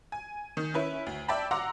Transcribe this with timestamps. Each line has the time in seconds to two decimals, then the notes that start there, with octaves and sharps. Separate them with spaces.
0.12 G#5
0.57 D#3
0.74 C#4 E4 B4
1.06 D2
1.28 D5 E5 G5 A5 B5
1.51 F#5 A#5 C6 D6 E6